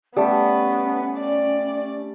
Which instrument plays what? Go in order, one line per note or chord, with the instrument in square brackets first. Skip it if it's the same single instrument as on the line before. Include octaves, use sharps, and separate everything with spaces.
[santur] G3 A3 A5 [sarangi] B3 [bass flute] C#4
[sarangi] D5